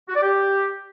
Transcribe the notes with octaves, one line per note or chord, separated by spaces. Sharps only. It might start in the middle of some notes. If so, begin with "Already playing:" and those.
F#4
D5
G4